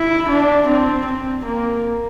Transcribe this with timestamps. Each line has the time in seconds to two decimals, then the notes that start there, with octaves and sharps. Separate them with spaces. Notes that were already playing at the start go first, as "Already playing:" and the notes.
Already playing: E4
0.29 D4
0.67 C4
1.06 C4
1.45 A#3